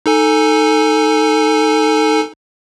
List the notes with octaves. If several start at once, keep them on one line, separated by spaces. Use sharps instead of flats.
D#4 A4 G#5